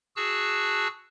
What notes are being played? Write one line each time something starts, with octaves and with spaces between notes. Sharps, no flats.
F#4 G#4 A5 E6 F#6